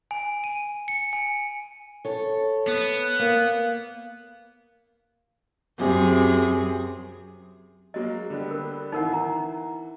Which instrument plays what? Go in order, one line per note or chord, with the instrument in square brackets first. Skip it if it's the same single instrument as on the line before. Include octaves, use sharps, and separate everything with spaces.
[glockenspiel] G#5
D#7
C#7
G#5
[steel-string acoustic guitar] A4 C#5
[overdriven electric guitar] B3
[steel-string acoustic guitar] A#3
[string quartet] F#2 C3 G#4
[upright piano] F#3 G#3 A#3 [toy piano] D#5
[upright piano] D3 G3 B3
[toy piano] A#4
[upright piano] G#1 E3 [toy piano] D#4 A#4 F#5
[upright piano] E3 [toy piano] F#5 A#5